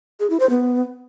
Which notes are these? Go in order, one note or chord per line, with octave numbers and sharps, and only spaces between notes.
G#4
E4
C5
B3